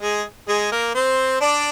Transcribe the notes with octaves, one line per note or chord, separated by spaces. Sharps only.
G#3 G#4
G#3 G#4
A#3 A#4
C4 C5
D4 D5